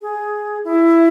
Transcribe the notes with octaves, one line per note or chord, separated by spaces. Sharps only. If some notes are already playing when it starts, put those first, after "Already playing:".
G#4
E4